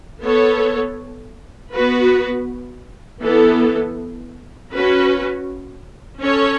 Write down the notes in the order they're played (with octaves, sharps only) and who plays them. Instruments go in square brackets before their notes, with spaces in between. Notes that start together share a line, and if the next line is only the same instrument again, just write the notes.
[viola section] B3 A4 C#5
B3 F#4 B4
E3 B3 A4
C#4 F#4 B4
C#4 A4 C#5